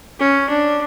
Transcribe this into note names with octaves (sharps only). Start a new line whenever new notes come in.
C#4
D4